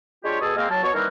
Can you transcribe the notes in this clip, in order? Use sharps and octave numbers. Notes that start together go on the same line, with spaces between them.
G#3 D4 F4 G4 C#5
B2 G#4 A4
G#3 A#3 C4
F#3 A5
B2 C#5 C#6
D#3 E3 G3 A#3 C4 B4